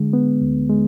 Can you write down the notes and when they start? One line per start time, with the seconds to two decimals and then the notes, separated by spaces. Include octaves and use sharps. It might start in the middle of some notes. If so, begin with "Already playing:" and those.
Already playing: D3 G#3
0.13 B3
0.41 D2
0.69 G#3